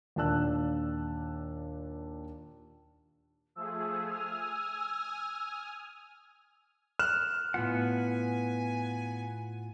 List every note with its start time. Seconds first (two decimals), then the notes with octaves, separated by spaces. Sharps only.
0.16 D#2 A#2 D4 A5 E6 F#6
3.56 F3 A3 G#4 E6
4.05 G#5 D#6 F6
6.99 F6 F#6 E7
7.54 A2 B3 F4 F#5 G#5